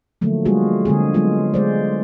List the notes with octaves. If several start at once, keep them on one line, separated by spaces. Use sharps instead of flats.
D3 F3 F#3 A3 A#3
G3 G#3 A#3 F4 F#4 G#4
D3 G#3 C4 G#4
F#3 G#3 B3 F4
G#3 C5 D5